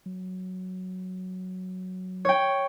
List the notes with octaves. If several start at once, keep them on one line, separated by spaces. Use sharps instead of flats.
F#3
C#5 G5